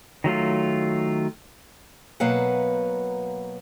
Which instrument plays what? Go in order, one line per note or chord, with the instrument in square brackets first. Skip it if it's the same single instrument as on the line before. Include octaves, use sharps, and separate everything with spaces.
[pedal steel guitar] D#3 F#3 A3 F4
[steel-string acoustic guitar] B2 F#3 A#3 B4 F5 F#5